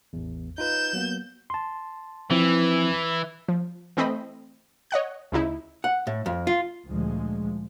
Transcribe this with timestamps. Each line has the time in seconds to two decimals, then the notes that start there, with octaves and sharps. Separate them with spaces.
0.13 A1 E2
0.58 D#4 F4 B4 G6 E7
0.93 F#3 A#3 B3
1.50 A5 C6
2.31 E3 F3 C4 E4
3.48 F3
3.97 E3 A3 C4 D#5 B5
4.91 C#5 D#5 F#5 F#6
5.32 D2 C#3 D#4 E4
5.84 F#5
6.07 A2
6.26 F2
6.47 F4
6.88 D2 A#2 F3 G#3